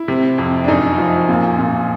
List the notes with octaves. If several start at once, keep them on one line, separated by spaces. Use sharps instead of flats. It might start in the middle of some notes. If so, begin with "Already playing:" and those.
Already playing: E4
C3
F2
D4
F#2 D#4
F3
A#2
A#2